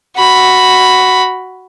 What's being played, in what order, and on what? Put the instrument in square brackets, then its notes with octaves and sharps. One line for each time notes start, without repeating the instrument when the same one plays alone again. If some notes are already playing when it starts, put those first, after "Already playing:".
[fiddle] F#4 B5